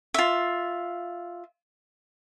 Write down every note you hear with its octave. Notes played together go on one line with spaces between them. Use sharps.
F4 E5